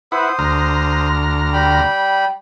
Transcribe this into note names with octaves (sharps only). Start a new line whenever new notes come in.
E4 B4 C5 F#5 D#6
D2 A#5 F6
G3 G5 B5